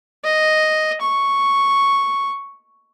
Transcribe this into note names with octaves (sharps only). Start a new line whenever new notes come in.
D#5
C#6